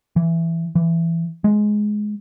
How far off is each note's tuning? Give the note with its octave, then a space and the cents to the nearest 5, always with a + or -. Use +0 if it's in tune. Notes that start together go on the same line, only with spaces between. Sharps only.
E3 +10
E3 +15
G#3 +10